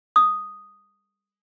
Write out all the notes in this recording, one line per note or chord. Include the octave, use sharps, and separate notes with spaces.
D#6